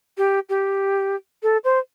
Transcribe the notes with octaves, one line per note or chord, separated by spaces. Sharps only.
G4
G4
A4
C5